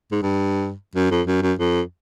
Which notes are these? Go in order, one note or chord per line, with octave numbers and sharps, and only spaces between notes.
G#2
G2
F#2
F2
F#2
F#2
F2